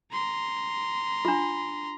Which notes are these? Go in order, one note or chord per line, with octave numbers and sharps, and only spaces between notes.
A#5 C6
D4 F4